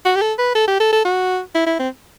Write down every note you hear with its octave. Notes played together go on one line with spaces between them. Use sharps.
F#4
G4
A4
B4
A4
G4
A4
A4
F#4
E4
E4
C4